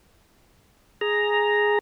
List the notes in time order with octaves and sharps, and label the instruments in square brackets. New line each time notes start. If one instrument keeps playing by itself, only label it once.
[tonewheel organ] G#4 A#5